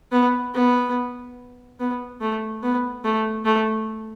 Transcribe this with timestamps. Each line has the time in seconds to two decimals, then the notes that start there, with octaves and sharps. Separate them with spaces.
0.12 B3
0.54 B3
1.79 B3
2.21 A3
2.63 B3
3.04 A3
3.45 A3